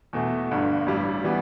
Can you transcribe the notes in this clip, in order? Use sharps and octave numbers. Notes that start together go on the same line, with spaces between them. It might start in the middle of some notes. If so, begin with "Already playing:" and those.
E2 B2 A3
G1 G2 D3
A1 G2 G3
E3 G3 B3